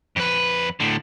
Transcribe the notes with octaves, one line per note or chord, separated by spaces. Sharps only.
F2 B4
A2 D3